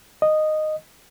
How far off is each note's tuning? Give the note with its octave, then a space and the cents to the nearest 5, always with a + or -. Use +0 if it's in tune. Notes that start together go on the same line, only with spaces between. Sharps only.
D#5 -10